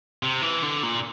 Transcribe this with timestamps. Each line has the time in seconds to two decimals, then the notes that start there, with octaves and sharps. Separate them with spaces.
0.23 C3
0.42 E3
0.63 D3
0.83 A#2